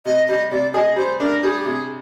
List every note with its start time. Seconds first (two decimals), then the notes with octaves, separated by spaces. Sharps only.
0.05 C3 D#5
0.28 G3 D#5
0.51 C3 D5
0.74 G#4 D#5
0.96 G3 C5
1.19 D4 A#4
1.42 G3 G#4
1.58 G4
1.65 C3 G#4